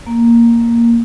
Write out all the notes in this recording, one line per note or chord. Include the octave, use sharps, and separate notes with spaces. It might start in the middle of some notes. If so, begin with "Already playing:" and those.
A#3